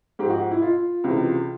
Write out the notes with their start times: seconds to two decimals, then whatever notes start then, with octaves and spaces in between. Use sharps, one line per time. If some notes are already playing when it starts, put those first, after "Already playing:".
0.19 G#2 F3 G4
0.30 F#4
0.51 E4
0.62 F4
1.04 C#2 C3 E3